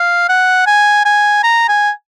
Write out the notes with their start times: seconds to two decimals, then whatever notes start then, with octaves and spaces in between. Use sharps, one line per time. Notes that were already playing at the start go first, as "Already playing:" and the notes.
Already playing: F5
0.29 F#5
0.67 G#5
1.05 G#5
1.44 A#5
1.69 G#5